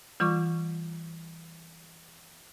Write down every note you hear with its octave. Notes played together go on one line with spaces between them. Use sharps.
E3 G3 F4 C#6 D6